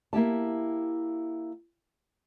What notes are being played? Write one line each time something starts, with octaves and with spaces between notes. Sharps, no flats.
A#3 E4 G4 A5